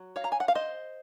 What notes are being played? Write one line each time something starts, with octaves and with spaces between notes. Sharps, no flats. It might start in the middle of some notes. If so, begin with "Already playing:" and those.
Already playing: F#3
C#5 F5
A#5
G#5
F#5
F5
C5 D#5